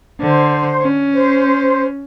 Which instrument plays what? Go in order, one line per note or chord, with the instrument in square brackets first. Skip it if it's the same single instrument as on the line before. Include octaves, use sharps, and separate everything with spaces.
[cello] D3 [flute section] C5
[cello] C#4
[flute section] C5